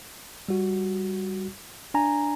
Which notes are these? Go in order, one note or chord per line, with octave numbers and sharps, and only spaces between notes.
G3 F#4
D4 G#5 A#5